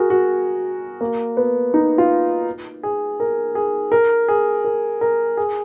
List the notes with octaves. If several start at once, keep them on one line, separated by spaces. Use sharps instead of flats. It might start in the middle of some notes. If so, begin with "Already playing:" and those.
Already playing: F#4 G#4 A#4
F#4
A#3
B3
D#4
F4
G#4
A#4
G#4
A#4
G#4
A#4
A#4
G#4